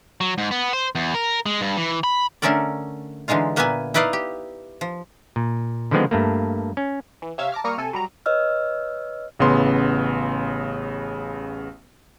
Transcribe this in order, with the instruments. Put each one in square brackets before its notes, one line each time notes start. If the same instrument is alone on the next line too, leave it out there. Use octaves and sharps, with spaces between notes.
[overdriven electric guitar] F#3
G#2
B3
C5
E2
A#4
G#3
G2
E3
B5
[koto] D3 A3 C#4 A4 A#4 D5
D3 E3 G#3 D#4 F4
A#2 A#3 B3 B4 E5 G#5
D#4 E4 B4 D5 D#5 F5
G4
F3
[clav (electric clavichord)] A#2
D3 D#3 F3 G#3 B3 C4
G2 A3 A#3
C#4
[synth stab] E3
C3 C#5 E5 F5 E6
A5 A#5 D6 F6
G3 A#3 A#5 C#6 D#6 F6
C3 A4 G#5
F#3 G3 A#5
[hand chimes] B4 C#5 D#5 E6 F6
[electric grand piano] A1 C#3 B3 C6